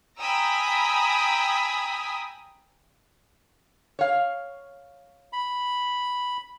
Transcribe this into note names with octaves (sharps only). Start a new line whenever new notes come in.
G5 G#5 A#5 B5 D#6 E6
C#5 F5
B5